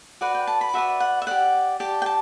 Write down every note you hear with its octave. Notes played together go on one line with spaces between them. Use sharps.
F#4 B4 D5 F#5
G5
A5
B5
F#4 B4 D5 E5
F#5
E5
G4 D5 F#5
G4 D5 A5
G5
A5